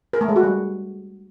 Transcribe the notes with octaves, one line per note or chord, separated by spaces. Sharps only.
A#4
A3
G#3
F#4
G3